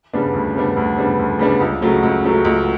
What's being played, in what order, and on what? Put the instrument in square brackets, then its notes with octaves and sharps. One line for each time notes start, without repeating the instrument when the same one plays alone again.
[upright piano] C#3 G3 B3 D4
D2
C#3 G3 B3 D4
D2
C#3 G3 B3 D4
D2
C#3 G3 B3 D4
C#2
C#3 F#3 A3
C#2
C#3 F#3 A3
C#2